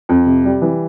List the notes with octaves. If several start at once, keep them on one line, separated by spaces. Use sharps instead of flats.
F2
C3
G3
E3